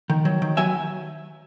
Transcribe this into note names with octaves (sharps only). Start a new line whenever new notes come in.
D#3
F#3
D#3
F#3 E5 G#5